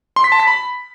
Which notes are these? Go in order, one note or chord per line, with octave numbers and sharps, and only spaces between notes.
C6
B6
A5
B6
B5